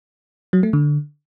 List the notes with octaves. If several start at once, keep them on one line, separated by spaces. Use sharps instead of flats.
F#3
A3
D3